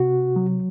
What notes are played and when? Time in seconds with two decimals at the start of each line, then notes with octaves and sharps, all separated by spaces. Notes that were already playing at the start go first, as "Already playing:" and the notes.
Already playing: C3 F#4
0.36 F#3